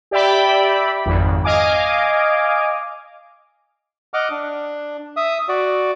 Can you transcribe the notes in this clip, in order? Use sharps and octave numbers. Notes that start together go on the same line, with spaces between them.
G4 D5 E5 G5 B5
G#1 F2
D#5 F5 G#5 D6
D#5 F#5 D6 F6
D4
E5 D#6
F#4 D5